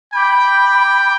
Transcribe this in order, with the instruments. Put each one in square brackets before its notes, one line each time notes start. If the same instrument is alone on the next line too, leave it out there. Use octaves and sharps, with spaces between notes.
[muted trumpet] G5 [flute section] B5 D6